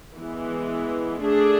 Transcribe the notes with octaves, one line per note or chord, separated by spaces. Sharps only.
E3 G#3 B3
A3 D4 G#4